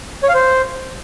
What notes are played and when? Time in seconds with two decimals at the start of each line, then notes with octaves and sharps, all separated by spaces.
0.23 C#5
0.29 F5
0.34 C5